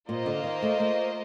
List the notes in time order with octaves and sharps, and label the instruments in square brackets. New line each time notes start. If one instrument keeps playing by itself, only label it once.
[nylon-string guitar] A#2 [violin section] A#3 F4 C5 D#5
[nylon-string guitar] D3
D#3
A3
A3